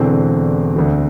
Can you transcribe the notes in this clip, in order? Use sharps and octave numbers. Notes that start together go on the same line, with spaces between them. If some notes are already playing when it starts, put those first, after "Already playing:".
Already playing: E1 E2 D3 C4
D2 D3